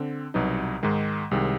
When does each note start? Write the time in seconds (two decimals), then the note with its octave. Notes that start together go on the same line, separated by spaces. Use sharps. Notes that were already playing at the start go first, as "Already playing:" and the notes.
Already playing: D3 C4
0.34 C2 B2 F#3 B3 D#4
0.83 G#2 D#3 G#3
1.31 C2 C3 D#3 G#3 C4